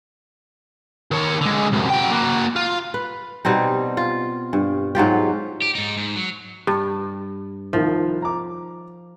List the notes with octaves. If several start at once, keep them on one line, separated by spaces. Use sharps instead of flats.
D#3 C#5
D3 G#3
C2 F#2
F#3 G5
A#3 F#4
F4
B4
B2 G3 C4 D#4
F4
G2
G#2 F#3 F4 G4
G4
G#2 D#4
G#2
F#3
G2
C2 D#3 F3
A#5 D6